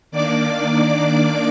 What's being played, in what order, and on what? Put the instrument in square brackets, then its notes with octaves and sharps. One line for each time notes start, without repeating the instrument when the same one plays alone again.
[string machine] D#3 A#3 D4 D5 D6